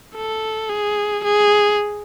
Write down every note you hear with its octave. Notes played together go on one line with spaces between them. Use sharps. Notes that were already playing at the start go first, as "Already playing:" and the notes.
A4
G#4
G#4